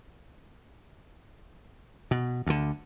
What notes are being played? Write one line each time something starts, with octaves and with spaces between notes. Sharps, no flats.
B2
D2 D3